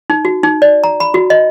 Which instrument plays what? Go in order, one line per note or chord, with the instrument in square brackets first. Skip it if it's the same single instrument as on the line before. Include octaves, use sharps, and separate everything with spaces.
[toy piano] D#4
F#4
D#4
D5
A#5
B5
F#4
D#5